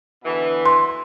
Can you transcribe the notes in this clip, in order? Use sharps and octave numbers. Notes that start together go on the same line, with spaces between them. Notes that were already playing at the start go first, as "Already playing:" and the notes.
B2 D3 E3
C6